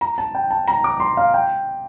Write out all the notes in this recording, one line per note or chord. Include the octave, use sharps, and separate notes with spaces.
A#5
A5
G5
A5
A#5
D6
C6
F5
G5